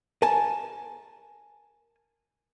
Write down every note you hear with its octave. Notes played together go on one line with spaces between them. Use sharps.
A#4 G#5 A5